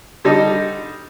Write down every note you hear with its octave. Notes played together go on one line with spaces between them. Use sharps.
D3 G3 D#4 A4